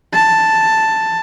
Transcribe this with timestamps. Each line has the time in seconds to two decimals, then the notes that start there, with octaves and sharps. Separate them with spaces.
0.13 A5